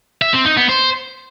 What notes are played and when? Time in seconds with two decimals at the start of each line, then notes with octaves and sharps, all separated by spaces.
0.22 E5
0.34 C4
0.45 D#4
0.57 B3
0.69 C5